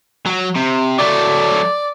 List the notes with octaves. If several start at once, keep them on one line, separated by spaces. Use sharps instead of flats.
F#3
C3
F#3 A3 D5